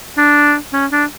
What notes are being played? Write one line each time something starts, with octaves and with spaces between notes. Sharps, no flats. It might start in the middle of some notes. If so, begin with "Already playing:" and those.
D4
C#4
D4